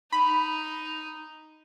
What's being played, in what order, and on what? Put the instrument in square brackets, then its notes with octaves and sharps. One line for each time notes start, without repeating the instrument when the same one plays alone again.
[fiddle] D#4 [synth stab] B5